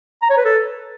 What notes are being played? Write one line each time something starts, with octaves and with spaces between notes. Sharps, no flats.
A#5
C#5
B4
A4